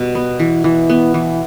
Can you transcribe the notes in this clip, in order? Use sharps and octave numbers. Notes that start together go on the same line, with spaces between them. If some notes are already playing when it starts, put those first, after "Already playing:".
Already playing: B2 G3
B3
E3
E3
B3
E3